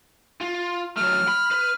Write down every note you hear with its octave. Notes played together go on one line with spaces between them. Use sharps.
F4
F#3 A3 F6
B5
B4